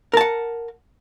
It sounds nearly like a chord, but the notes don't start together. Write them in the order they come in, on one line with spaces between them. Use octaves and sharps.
A#4 A5 F#5